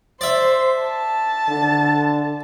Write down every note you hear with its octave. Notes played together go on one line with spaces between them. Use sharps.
C5 D5 E5
A5
D3